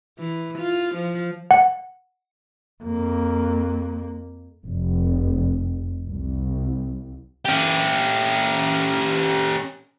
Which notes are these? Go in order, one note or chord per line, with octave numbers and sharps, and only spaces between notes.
E3
F4
F3
F#5
F2 A#3
F1
C2
C#4 G4